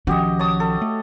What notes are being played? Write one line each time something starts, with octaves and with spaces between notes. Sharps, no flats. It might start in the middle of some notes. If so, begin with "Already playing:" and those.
B1 D#3 F3 C#4 F#4 G4 D#5
C#5 A5 D#6
A4
A3